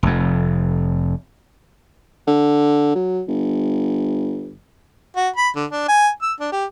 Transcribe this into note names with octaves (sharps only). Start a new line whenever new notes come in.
F1 F2
D3
F#3
G1
F#4
B5
D3
D4
G#5
E6
D4
G4